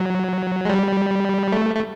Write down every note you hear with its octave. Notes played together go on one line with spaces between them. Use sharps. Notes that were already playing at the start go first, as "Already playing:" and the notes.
Already playing: F#3
G#3
G3
A3
A3